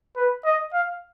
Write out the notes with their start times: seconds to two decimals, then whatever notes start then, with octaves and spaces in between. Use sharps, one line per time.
0.16 B4
0.45 D#5
0.73 F5